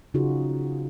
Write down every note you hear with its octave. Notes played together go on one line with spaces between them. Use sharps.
C#3 D#4 F4 F#4 G#4